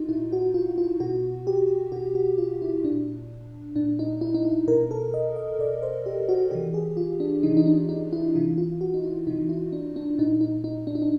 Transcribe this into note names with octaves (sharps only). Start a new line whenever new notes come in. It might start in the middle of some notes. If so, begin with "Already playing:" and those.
Already playing: D#4 F4 F#4
A#2 E4
F#4
F4
F4
B2 F#4
G4
B2 F#4
F#4
F4
E4
A#2 D4
A#2 D4
D#4
E4
D#4
E4
B2 A#4
A4
D#5
D#5
B2 D5
C5
G4
F#4
C3 E3 G4
G#4
F4
D4
C3 E3 D#4
D#4
D4
D#4
E4
C3 E3 F4
F4
F#4
D#4
E4
C3 E3 D#4
E4
D4
D4
A#2 D#4
D#4
D#4
D4
D#4
D4